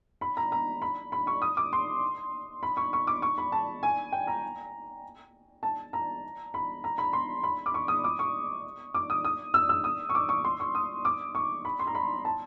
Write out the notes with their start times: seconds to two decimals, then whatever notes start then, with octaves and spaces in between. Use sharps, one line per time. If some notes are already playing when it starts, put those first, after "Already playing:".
0.21 B5
0.37 A#5
0.52 A#5
0.82 B5
1.12 B5
1.27 C#6
1.42 D#6
1.57 D6
1.73 C6
2.63 B5
2.77 C#6
2.93 C#6
3.07 D6
3.22 C#6
3.38 B5
3.52 A5
3.83 G#5
4.12 G5
4.27 A#5
5.63 A5
5.93 A#5
6.54 B5
6.84 A#5
6.98 B5
7.13 C6
7.43 B5
7.66 D6
7.74 C#6
7.88 D#6
8.04 D6
8.19 C#6
8.94 D6
9.10 D#6
9.25 D#6
9.54 E6
9.69 E6
9.84 D#6
10.09 C#6
10.15 D6
10.29 C#6
10.44 C6
10.60 C#6
10.75 D#6
11.05 D6
11.35 C#6
11.65 B5
11.79 C6
11.87 A#5
11.95 B5
12.25 A5